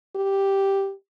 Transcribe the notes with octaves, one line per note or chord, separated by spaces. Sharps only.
G4